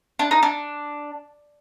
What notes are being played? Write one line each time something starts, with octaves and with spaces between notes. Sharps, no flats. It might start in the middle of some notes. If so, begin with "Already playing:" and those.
D4
D#4
D4